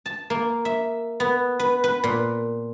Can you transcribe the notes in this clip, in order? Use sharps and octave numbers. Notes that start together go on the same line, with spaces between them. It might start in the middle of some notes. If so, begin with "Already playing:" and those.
A5
A#3
E5
B3
B4
B4
A#2